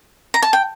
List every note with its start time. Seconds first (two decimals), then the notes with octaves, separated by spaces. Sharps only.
0.34 A#5
0.42 A5
0.53 G5